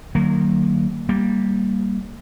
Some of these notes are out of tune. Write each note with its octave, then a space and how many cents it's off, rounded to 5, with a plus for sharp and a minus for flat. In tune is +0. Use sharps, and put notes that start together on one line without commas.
D#3 -35 F#3 +25 A#3 -20
G3 +0 A#3 +0